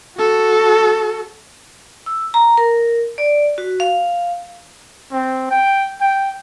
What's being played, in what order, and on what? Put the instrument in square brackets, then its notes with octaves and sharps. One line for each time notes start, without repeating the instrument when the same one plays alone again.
[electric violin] F#4 A4
[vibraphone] E6
A#5
A#4
D5
F#4
F5
[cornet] C4
G5
G5